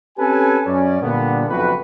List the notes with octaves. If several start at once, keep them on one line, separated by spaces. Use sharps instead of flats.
C4 C#4 G4 A4 B4 G#5
F#2 C#4 D5
A#2 D3 G3 B3
F#1 B1 F2 F#4 B4